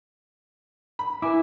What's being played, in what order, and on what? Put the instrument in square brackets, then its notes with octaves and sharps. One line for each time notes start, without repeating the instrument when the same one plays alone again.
[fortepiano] B5
[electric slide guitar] E4 [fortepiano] B4 G#5 D6